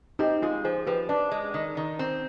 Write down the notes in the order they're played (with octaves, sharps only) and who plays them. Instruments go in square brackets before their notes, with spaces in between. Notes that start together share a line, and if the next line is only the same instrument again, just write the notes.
[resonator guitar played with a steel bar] C4 [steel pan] D#4 G4
[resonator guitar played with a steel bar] G#3 [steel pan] F4 G#4
[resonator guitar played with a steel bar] F3 [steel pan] G#4 C5
[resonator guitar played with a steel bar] F3 [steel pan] G4 B4
[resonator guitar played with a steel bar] D4 [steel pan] B4 D5
[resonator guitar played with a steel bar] G#3
D#3
D#3
C4